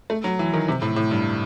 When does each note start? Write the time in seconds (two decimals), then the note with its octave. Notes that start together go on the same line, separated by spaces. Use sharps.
0.10 A3
0.24 F#3
0.39 E3
0.54 D#3
0.68 C3
0.82 A2
0.96 A2
1.11 G2